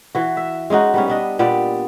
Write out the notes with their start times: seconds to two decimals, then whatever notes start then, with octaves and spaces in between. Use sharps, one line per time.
0.15 E3 F#4
0.37 E5
0.70 G#3 C#4 D#4 F#4
0.94 G3 B3 C#4
1.08 B3 D4 D#5
1.39 A#2 B3 G4 D5